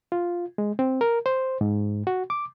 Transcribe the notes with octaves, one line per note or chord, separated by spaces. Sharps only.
F4
G#3
C4
A#4
C5
G#2
F#4
D6